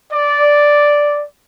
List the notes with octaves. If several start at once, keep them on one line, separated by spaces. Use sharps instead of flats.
D5